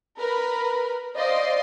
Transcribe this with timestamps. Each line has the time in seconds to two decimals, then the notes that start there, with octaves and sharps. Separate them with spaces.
0.19 A#4 B4 B5
1.16 C5 D5 D#5 F5 C6